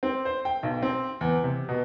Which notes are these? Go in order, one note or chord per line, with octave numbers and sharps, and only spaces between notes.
C4
C5
G5
B1
C4
E2
C3
B2